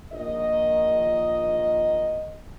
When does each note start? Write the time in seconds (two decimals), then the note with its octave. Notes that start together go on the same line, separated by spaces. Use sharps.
0.12 A#1 D#3 D#5